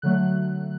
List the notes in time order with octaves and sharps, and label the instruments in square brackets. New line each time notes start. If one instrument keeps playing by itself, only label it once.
[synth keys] D3 F#3 A3 F#6